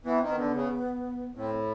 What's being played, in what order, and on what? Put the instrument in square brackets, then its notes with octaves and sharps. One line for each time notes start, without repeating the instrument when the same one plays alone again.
[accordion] E3 [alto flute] B3
[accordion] D#3 [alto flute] C4
[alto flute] B3
[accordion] D3
C#3
[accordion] A2 [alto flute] C4